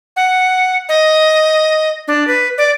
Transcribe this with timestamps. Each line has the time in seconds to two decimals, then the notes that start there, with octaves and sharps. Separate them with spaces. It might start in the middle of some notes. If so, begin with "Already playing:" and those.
0.16 F#5
0.89 D#5
2.08 D4
2.27 B4
2.58 D5